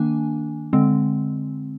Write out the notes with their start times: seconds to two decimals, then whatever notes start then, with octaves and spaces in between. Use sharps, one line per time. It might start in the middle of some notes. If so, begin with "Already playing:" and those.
Already playing: D#3 A#3 D4 G#5
0.73 D3 G#3 C4